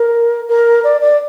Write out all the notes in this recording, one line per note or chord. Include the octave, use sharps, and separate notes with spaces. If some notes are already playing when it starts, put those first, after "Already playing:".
Already playing: A#4
A#4
D5
D5